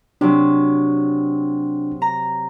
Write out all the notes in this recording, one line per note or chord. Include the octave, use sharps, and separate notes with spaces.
C3 F#3 D4
A#5